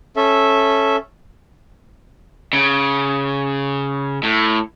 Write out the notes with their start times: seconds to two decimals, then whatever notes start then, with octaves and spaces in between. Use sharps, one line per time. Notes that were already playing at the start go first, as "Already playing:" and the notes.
0.16 C#4 A4 E5
2.53 C#3
4.23 A2